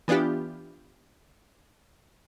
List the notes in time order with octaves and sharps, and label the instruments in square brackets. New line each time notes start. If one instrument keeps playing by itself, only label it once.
[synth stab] E3 B3 D4 F4 G4